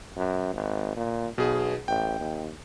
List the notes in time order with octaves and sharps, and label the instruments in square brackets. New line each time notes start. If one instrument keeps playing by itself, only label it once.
[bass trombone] F#2
G#1
A#2
[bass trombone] B1 [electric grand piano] B2 G#4
[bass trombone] A1 [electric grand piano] G5
[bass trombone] D#2